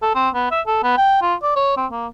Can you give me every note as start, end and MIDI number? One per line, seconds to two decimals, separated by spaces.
0.02 0.13 69
0.15 0.29 60
0.34 0.50 59
0.51 0.61 76
0.67 0.82 69
0.83 0.95 59
0.97 1.22 79
1.22 1.35 65
1.43 1.53 74
1.56 1.77 73
1.77 1.86 60
1.91 2.07 58